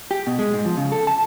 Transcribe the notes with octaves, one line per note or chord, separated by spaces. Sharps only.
G4
B2
G#3
G#2
F3
C#3
A4
A5